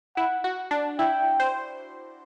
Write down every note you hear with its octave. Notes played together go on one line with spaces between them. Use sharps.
E4 F#5
F#4
D4
E4 G5
C5